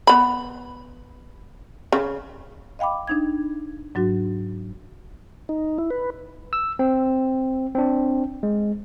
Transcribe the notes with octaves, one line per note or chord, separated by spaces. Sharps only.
B3 B5
C#3
D#5 F5 G5 B5 D6
D4 D#4 G#6
G#2 F#3 D4 F#4
D#4
E4
B4
E6
C4
C4 D4
G#3